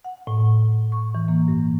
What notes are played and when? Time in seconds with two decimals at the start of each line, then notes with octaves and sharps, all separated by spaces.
0.04 F#5
0.27 A2
0.92 C#6
1.15 E3
1.28 A#3
1.48 G2